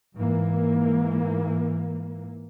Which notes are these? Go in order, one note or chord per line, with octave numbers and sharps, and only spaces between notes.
G#2 E3 A#3